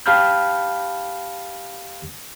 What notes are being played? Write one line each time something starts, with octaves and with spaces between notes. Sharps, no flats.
G4 F5 A5 B5 F6 G6